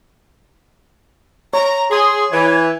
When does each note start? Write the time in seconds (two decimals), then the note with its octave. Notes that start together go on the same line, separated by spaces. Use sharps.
1.53 C#5 A#5
1.91 G#4 C6
2.32 E3 G#6